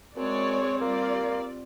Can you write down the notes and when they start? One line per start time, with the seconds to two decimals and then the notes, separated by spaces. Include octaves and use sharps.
0.17 F#2 G#3 C4 C#5 D5
0.81 G3 A#3 F4 D5